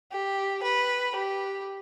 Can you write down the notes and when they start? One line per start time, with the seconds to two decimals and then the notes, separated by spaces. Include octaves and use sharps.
0.11 G4
0.63 B4
1.15 G4